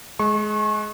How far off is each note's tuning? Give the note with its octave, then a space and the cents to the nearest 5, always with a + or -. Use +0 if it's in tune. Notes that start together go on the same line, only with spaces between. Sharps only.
G#3 +25 C#6 -30